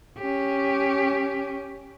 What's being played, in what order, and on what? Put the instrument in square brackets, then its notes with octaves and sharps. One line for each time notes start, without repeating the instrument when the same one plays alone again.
[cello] C#4 G4